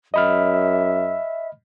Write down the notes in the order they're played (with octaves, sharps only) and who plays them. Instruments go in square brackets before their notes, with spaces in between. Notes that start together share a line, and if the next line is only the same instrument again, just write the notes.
[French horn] F#2 [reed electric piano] D#5 B5 F6 [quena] E5